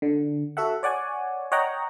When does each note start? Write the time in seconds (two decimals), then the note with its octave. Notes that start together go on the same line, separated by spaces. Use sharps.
0.02 D3
0.57 F#4 A4 E5 F#5
0.83 C#5 D5 F#5 G#5
1.52 C#5 D#5 F#5 G5 A#5